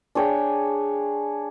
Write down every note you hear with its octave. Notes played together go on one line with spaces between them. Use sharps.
D4 G#4 C#5 G5